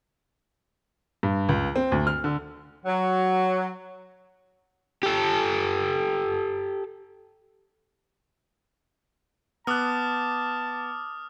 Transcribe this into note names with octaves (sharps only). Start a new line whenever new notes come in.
G2
C#2
C4
D2
F6
D3
F#3
G4 A4
B3 A5 D6 D#6 F6 F#6